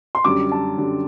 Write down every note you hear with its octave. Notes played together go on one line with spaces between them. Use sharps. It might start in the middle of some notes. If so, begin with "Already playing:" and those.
C6
F#2 D3 G3 D6
A5
F#2 D3 G3